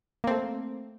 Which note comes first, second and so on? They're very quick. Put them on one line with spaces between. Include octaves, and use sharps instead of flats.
A#3 C4 A3